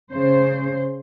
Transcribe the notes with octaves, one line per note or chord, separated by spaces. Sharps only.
C#3 C5